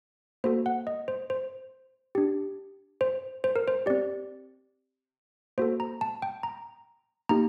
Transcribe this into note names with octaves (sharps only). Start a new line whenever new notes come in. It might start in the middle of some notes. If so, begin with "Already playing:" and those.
A#3 F#4 A4 C5
F#5
D#5
C5
C5
D4 G4
C5
C5
A#4
C5
C4 G4 D5
A#3 F#4 A4 C5
A#5
A5
G5
A#5
A#3 D#4 G4 A#5